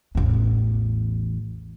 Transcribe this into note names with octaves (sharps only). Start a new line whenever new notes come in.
A1 E2